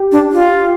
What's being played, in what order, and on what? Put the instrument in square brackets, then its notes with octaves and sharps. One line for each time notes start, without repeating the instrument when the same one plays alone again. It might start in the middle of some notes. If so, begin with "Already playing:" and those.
Already playing: [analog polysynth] G4
[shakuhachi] D4
F4